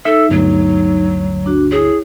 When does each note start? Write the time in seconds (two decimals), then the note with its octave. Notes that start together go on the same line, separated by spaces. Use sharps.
0.05 D#4 A4 E5 E6
0.30 G1 D2 F#3
1.46 D4 F#4
1.72 E4 G#4 C#5